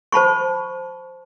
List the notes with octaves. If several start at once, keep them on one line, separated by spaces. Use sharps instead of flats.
C5 A5 B5 C#6